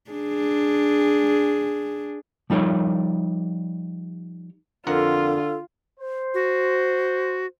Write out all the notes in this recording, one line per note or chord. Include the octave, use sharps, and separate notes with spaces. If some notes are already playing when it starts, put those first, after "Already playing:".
D4 G#4
F3 G3 D#4 A#4 C#5
F2 D3 F4 A4 A#4 F#5
C5
F#4